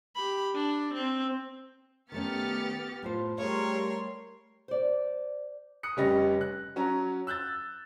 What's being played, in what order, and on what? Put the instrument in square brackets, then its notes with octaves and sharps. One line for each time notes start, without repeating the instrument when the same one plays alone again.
[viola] G4 B5
D4
C4
[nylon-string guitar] D#3 A3 C#4 [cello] B3 G4 [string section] F6 A6 C#7
[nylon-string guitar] A2 F4 C5
[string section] G3 A#4 [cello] A3 [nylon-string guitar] G#4 F5 [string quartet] C#5 C6
[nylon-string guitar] C5 D5
[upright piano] D#6 F#6 C#7
F1 G3 C#4 G4 D#5 A#6
F#6
F#3 C#4 A#5
E6 F#6 G6 A6